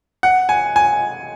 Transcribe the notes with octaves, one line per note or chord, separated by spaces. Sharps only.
F#5
G#5
G#5